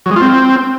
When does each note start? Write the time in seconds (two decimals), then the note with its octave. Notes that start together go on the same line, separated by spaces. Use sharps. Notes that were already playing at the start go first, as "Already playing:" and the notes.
0.06 F#3
0.11 G#3
0.16 F4
0.21 C4